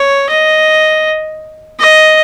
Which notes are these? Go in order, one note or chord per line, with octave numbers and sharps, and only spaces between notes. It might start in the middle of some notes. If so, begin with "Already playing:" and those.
Already playing: C#5
D#5
D#5